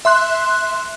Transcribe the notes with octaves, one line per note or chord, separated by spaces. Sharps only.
E5 C6 F#6